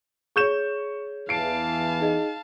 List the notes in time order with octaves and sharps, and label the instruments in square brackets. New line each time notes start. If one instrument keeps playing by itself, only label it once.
[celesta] G#4 C#5 [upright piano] C#6 G6 E7
[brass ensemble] E2 E3 [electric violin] F5 A5 [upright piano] C7 D7
[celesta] D#4 G#4 D#5